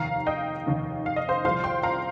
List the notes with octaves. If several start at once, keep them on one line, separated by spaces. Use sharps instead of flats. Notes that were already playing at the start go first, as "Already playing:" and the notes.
Already playing: F1 D#2 D#3 F5 A#5
D#5 G5
F1 D#2 D#3
F5
D#5
C5 F5
C2 A#2 F3 C5 F5
G5 C6
F5 A#5